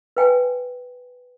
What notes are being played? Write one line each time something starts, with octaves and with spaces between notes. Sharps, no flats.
B4 G5 G#5